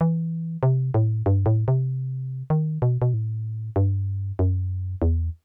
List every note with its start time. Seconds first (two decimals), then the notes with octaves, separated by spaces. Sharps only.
0.01 E3
0.63 C3
0.94 A2
1.26 G2
1.46 A2
1.68 C3
2.50 D#3
2.82 B2
3.02 B2
3.14 A2
3.76 G2
4.39 F#2
5.02 E2